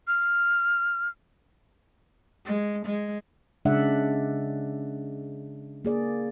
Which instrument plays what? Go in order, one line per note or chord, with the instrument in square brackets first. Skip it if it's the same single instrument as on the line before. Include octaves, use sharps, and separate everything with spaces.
[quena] F6
[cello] G#3
G#3
[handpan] C#3 G#3 D4 D5 E5 F#5
A#3 G#4 D5